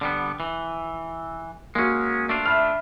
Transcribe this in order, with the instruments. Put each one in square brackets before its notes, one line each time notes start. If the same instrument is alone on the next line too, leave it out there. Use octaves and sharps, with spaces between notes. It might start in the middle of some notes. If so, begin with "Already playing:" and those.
[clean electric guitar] D3 G3 B3
E3
[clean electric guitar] G#3 C#4 [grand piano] A#3 F#4
[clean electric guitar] A3 D4 F4
[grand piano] E5 B5 F6